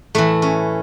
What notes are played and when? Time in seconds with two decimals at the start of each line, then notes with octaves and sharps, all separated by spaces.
0.15 A2 E3 A3
0.42 C#4